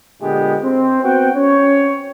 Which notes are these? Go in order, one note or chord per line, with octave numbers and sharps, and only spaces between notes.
A#2 D3 G#3 B3 G4
C4
B3 C4 F#4 G5
C#4 C#5